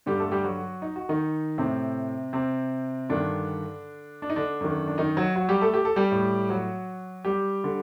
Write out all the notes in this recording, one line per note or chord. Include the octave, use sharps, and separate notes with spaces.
G2 D3 G3 G4
A3 A4
G3 G4
F#3 F#4
D#4
F#4
D#3 D#4
A2 C3 C4
C3 C4
G2 D3 D#3 D4
D4
D#4
D3 D4
F#2 D#3
D4
D#3 D#4
F#3 F#4
F#3 F#4
G3 G4
A3 A4
G4
A4
G3 G4
A2
F#3 F#4
G3 G4
D3